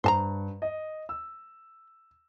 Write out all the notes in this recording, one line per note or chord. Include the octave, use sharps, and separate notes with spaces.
G2 C5 A5 A#5
D#5
E6